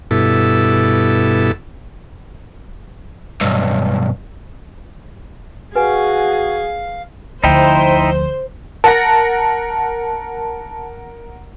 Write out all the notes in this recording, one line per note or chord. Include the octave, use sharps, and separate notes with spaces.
G2 B2 E4 A4
B1 G2
F#4 G#4 B4 F5 G#5
D2 F3 D#4 E4 C5 G5
A#4 F#5 A5 A#6